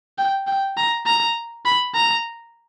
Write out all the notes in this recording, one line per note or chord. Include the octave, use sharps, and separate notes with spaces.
G5
G5
A#5
A#5
B5
A#5